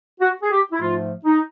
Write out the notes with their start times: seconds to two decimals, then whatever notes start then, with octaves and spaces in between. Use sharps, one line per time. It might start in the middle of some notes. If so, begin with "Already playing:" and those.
0.20 F#4
0.42 G#4
0.51 G4
0.72 E4
0.80 G#2 F3 A3 F4
1.25 D#4